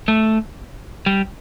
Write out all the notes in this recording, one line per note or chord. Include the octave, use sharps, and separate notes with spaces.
A3
G3